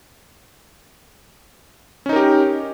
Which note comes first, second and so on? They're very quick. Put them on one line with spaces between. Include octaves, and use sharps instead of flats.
C#4 D#4 A#4 G4